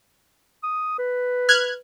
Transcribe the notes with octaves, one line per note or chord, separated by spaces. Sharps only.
D#6
B4
F6 F#6 G#6